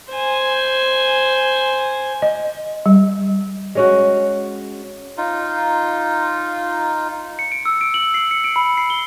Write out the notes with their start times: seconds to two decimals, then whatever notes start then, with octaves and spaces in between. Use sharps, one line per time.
0.11 C5 G#5
2.22 D#5
2.86 G3
3.75 G#3 C#4 F#4
5.18 D#4 F4
7.39 C#7
7.52 D7
7.65 E6
7.81 D7
7.94 F#7
8.14 C7
8.31 C#7
8.44 D7
8.56 B5
8.77 C7
8.90 G7